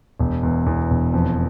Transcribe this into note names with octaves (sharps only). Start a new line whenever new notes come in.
E1
E2
E2
E1
F2